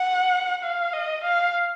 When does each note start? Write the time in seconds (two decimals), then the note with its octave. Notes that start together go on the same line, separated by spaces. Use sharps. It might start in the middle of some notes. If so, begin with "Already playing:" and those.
Already playing: F#5
0.63 F5
0.93 D#5
1.24 F5